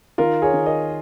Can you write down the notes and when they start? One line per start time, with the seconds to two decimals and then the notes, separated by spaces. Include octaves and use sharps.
0.18 D#3 F4 A#4
0.42 G#4 C#5
0.54 D#3
0.66 A#4 D#5